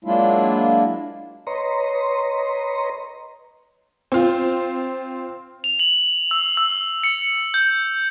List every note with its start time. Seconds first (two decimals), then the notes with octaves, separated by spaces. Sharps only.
0.04 F#3 G#3 A#3 D4 E4 F4
1.47 B4 C#5 D#5 A#5 C6
4.12 C4 F4
5.64 F7
5.79 F#7
6.31 E6
6.57 E6
7.04 C#7
7.54 G6